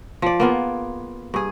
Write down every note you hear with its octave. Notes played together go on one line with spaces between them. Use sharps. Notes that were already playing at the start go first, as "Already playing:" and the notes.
F3 D5
A#3 B3 F4 G#4
G2 G#4